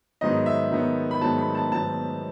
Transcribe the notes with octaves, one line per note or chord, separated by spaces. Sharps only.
G#2 D#3 F#3 B3 D#5
E5
G#2 D#3 F#3 B3
B5
G#2 D#3 F#3 B3 A5
B5
A5
G#2 D#3 F#3 B3 A5